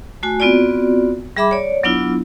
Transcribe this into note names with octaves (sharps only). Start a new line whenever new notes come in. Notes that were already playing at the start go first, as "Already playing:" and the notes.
A3 F#4 G#5
B3 C4 F4 F#4 D5
G3 G#4 E5 B5 D6
C#5 D5
F#3 B3 D4 E4 F4